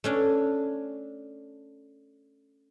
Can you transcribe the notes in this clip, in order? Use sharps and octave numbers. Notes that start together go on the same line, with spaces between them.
A3 C#4 D4